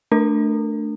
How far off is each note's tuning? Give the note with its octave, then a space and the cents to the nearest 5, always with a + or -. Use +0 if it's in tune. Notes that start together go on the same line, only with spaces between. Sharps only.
A3 +0 D4 +0 A#4 -35